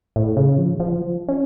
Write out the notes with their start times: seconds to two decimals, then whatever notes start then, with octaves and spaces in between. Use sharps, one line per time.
0.16 A2
0.37 C#3
0.58 F3
0.80 F3
1.28 C#4